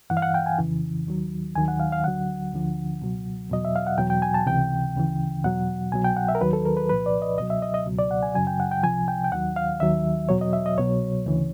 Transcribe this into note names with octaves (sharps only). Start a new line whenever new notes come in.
G2 E3 F#5
F5
F#5
G5
G#5
F2 C#3 E3
D#2 D#3 F#3
D#2 D#3 F#3 G#5
F#5
F5
F5
D2 D3 F#3 F#5
D2 D3 F3
C#2 B2 F#3
E2 B2 F#3 D#5
E5
F5
F#5
E2 B2 F#3 G5
G5
G#5
A5
C#2 C3 E3 G5
D2 C#3 E3
E2 B2 F#3 F#5
C2 B2 F#3 G#5
G5
F#5
E5
A#4
D#2 D#3 F#3 B4
A4
A#4
B4
C2 A#2 F3 B4
D5
D#5
C#2 B2 F#3 D#5
E5
D#5
D#5
C#2 B2 F#3
D5
F#5
G#5
F#2 C#3 F#3 G#5
G5
F#5
G5
C2 C3 F3 G#5
G5
G5
D#2 D#3 F#3 F#5
F5
D#2 D#3 F#3 E5
E2 B2 F#3 C#5
D#5
E5
D#5
C2 B2 F#3 C#5
D2 C#3 E3